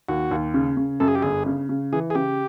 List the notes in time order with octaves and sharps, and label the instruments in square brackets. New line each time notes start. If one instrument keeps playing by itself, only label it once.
[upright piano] D#2 [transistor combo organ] F#4
[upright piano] D#2
C#3
C#3
[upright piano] F#2 [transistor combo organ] A4
[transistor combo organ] G#4
G4
[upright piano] G1 [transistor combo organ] G#4
[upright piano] C#3
C#3
[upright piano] E3 [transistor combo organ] G#4
[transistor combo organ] G#4
[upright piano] C#3 [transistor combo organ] G4